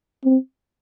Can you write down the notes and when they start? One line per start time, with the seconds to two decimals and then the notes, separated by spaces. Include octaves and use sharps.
0.24 C4